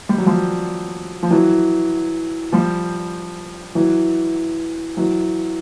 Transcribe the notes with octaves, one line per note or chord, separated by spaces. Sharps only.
G3
F#3
F3 G3
F3
E3 F#3
F3 G3
E3 F#3
E3 F#3